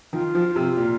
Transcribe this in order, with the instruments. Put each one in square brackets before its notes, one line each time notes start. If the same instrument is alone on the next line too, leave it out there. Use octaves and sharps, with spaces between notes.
[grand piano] D#3 [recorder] F4
[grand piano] F3
C3
A#2